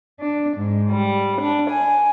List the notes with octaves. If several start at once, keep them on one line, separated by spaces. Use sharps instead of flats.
D4
G#2
G3
D4
G#5